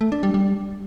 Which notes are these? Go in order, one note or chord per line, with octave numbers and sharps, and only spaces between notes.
A3
D4
G3
G3